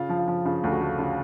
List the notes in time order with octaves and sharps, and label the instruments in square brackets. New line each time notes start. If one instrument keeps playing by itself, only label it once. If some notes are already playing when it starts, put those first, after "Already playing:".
Already playing: [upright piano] C#3 F4
F3
F4
F3
C#3 F4
D2
F#4
A3
C#3 F4